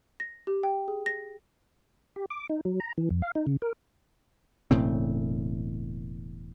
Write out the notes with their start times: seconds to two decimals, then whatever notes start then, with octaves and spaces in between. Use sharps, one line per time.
0.20 A#6
0.47 G4
0.63 G5
0.88 G#4
1.06 A#6
2.16 G4
2.30 D6
2.49 D#4
2.65 F#3
2.80 A#5
2.98 E3
3.10 F2
3.22 F5
3.35 D#4
3.47 C#3
3.62 A#4
4.71 E1 A2 C#3 C4